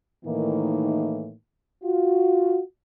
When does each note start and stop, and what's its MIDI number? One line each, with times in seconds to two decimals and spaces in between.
0.24 1.32 45
0.24 1.32 51
0.24 1.32 52
0.24 1.32 58
0.24 1.32 63
1.84 2.59 65
1.84 2.59 66